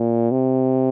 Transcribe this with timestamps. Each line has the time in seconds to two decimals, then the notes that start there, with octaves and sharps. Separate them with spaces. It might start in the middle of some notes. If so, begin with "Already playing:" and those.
Already playing: A#2
0.32 C3